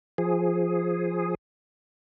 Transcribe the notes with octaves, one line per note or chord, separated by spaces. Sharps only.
F3 G#4